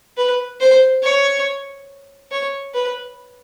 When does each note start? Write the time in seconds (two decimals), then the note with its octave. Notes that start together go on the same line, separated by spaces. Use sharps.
0.17 B4
0.60 C5
1.03 C#5
2.31 C#5
2.74 B4